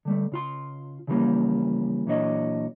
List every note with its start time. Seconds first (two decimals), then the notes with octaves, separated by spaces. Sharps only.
0.05 D3 G3 A3
0.32 C#3 F4 C6
1.07 C#3 E3 F3 G3 A#3 C#4
2.07 A#2 E3 F#3 D4 C#5 D#5